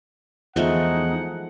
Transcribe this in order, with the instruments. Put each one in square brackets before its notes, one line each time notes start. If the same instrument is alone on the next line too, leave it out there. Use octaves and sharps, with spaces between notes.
[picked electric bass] E2 [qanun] F3 G#3 A3 [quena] D#4 [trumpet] F#5